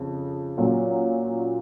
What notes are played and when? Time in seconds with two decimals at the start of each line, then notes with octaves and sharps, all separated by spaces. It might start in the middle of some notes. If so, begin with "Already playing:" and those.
Already playing: F2 C#3
0.58 A#2 F#3 C#4 F4